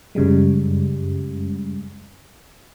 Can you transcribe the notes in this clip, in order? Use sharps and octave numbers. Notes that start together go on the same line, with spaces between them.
F#2 C#3 G3 G#3